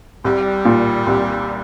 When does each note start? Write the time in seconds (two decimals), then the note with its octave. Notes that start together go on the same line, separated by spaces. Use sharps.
0.24 C2 G3
0.65 A#2
1.07 C2